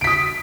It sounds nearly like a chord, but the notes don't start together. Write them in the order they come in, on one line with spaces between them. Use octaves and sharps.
D7 B6 D#6